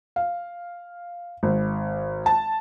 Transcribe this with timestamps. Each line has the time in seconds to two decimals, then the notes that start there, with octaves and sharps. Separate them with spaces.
0.16 F5
1.43 G#1
2.26 A5